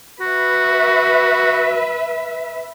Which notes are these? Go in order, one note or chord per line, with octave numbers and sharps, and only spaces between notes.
F#4 B4 E5